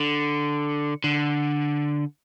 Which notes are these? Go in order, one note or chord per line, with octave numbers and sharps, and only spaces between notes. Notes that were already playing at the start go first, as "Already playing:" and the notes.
Already playing: D3
D3